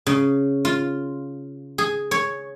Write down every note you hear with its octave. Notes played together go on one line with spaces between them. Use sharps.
C#3
F4
G#4
C#5